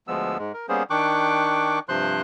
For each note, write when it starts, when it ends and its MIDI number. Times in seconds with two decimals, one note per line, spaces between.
0.08 0.38 38
0.08 0.38 53
0.08 0.38 56
0.08 0.38 59
0.08 0.38 88
0.39 0.52 44
0.39 0.52 56
0.54 0.66 70
0.69 0.83 55
0.69 0.83 58
0.69 0.83 59
0.69 0.83 61
0.69 0.83 68
0.69 0.83 72
0.90 1.79 51
0.90 1.79 62
0.90 1.79 79
0.90 1.79 85
0.90 1.79 86
0.90 1.79 90
1.89 2.22 43
1.89 2.22 48
1.89 2.22 53
1.89 2.22 72
1.89 2.22 84
1.89 2.22 90